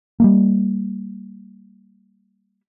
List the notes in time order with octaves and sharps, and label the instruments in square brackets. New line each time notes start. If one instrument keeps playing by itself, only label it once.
[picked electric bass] G3 A3 A#3